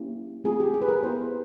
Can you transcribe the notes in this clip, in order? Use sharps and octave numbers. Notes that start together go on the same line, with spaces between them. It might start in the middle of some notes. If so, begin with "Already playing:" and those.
Already playing: A#3 C#4 E4 G4
A3 C4 F4 G#4
G4
G#4
B4
A#4
B3 E4 G4 C5